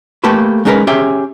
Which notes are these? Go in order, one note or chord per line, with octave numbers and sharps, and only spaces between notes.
A3 A#3 G4 A4 B4
G#3 C#4 D#4 G#4 A#4 B4
C#4 G4 G#4 C#5 E5